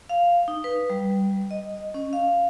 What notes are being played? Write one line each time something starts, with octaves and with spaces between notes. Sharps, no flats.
F5
D#4
B4
G3
D#5
C#4
F5